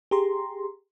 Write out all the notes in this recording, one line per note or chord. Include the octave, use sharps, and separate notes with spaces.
G4 G#4 A#5 C6